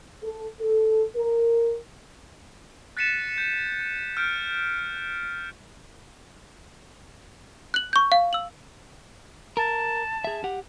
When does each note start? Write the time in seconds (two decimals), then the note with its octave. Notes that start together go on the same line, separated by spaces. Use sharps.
0.23 A4
0.60 A4
1.16 A#4
2.97 F#6 A6 B6 C#7 D#7 E7
3.38 G6
4.17 F6 G6 D7
7.74 F#6 F#7
7.93 C#6 G6
8.12 F5
8.33 E6 F#7
9.57 A#4 A5
10.24 G#4 E5
10.44 G4 F#5